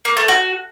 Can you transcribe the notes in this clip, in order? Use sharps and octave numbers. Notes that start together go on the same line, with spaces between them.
A#3
A3
F#4